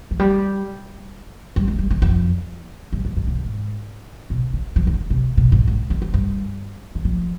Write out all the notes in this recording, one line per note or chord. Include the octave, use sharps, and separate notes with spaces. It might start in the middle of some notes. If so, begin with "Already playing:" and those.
F3
G3
G3
G#3
G3
D#3
F2
G2
G#2
G#2
B2
G#2
B2
D3
F3
D#3
C3
B2
G#2
G#2
F2
F2
G2
D#3
F3